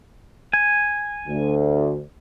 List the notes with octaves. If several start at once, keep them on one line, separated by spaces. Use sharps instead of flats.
G#5
D2